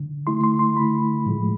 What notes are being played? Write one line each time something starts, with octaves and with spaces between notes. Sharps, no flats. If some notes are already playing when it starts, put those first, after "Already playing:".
Already playing: D3
D3 A3 E4 C6
C6
C6
D3 A3 E4 B5
A2 F3 G#3